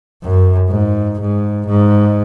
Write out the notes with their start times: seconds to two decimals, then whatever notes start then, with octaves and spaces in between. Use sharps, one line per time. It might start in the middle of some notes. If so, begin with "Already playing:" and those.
0.23 F#2
0.69 G#2
1.20 G#2
1.67 G#2